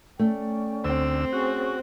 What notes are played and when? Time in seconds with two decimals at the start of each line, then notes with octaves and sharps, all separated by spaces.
0.19 A3 C#4 D5 G5
0.84 D2 C4 E6
1.33 C#4 F#4 G#4 C#6